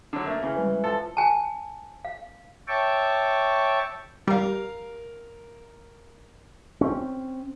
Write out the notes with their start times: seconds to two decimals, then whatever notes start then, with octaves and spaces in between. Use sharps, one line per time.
0.13 D3 F#3
0.26 A3 A#3
0.43 C#3 E3
0.56 G3 G#3 B4
0.84 F3 A4
1.17 G#5 A5
2.05 F5
2.68 C#5 E5 G5 A5 C#6 D6
4.27 G3 A#4 F5
6.81 C4 C#4